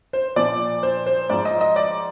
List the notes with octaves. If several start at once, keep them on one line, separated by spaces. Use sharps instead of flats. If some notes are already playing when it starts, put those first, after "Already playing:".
C5
A#2 F3 D5
C5
C5
G#2 F3 D5
D#5
D#5
D5